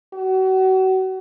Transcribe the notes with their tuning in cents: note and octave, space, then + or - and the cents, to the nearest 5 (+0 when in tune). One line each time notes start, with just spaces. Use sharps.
F#4 +35